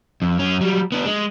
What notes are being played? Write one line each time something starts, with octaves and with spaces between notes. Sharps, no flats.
F2
F#2 C#4
F#3 G3
B3 D4
G#3